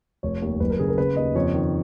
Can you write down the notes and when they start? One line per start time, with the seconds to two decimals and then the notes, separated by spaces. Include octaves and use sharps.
0.23 F1 C#5
0.42 D#2
0.60 F#1 B4
0.70 A#4
0.79 C#3 G#4
0.88 A#4
0.98 C#3 B4
1.16 D#2 D#5
1.35 F2 C#5
1.54 D#3